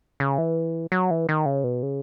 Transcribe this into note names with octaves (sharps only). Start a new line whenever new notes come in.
C#3
E3
F#3
E3
D#3
C#3
B2
C#3